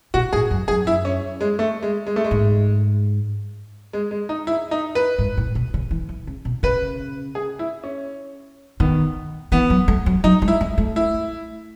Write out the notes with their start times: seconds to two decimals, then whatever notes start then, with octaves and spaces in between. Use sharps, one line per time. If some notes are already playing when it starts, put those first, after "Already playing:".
0.14 B2 F#4
0.33 A2 G#4
0.51 F#2
0.68 F#2 G#4
0.87 E4
1.05 C#4
1.41 G#3
1.59 A3
1.83 G#3
2.07 G#3
2.16 A3
2.24 G#3
2.31 G#2
3.93 G#3
4.11 G#3
4.29 D#4
4.47 E4
4.71 D#4
4.95 B4
5.19 G#2
5.37 A2
5.55 B2
5.74 C#3
5.91 E3
6.09 E3
6.27 C#3
6.45 B2
6.63 C#3 B4
7.35 G#4
7.59 E4
7.84 C#4
8.80 D#3 B3
9.52 E3 B3
9.70 F#3
9.88 A3
10.06 F#3
10.24 F#3 D#4
10.42 G#3
10.48 E4
10.61 A3
10.78 A3
10.96 E4